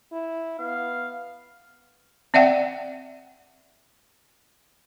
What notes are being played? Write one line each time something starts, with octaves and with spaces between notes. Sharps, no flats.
E4
B3 F5
C4 D5 E5 F#5 G5